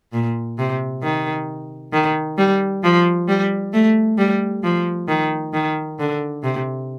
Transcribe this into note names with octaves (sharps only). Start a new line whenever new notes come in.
A#2
C3
D#3
D#3
G3
F3
G3
A3
G3
F3
D#3
D#3
D3
C3